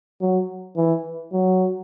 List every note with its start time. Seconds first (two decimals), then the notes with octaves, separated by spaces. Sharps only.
0.21 F#3
0.77 E3
1.32 F#3